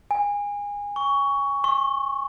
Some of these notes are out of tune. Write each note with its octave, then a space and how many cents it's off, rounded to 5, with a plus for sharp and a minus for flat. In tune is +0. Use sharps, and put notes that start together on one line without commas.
G#5 -25
C#6 +15
C#6 -35